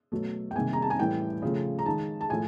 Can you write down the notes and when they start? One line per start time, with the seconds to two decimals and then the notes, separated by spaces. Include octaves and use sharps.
0.12 B2 F#3 A3
0.51 G5
0.56 C3 D#3 G3 A#3 G#5
0.73 A#5
0.82 A5
0.90 G#5
0.99 A2 E3 G3 G5
1.42 C#3 F3 A3
1.79 A#5
1.86 D#3 G#3 A5
2.21 A5
2.30 A2 F3 A3 G#5